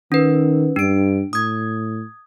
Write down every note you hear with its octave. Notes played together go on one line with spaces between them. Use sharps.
D#3 C#4 B4
G2 D4 D7
A2 D#6 G#6